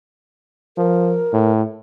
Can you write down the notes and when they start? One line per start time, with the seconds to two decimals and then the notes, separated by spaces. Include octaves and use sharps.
0.78 F3 A#4
1.33 A2